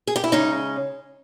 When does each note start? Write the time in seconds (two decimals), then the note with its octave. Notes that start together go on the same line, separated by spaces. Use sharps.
0.07 G#4
0.16 G4
0.24 E4
0.32 C#3 G#3 C#4 D#4